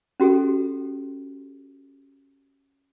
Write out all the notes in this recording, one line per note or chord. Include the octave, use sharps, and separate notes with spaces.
C#4 F#4 G4 A4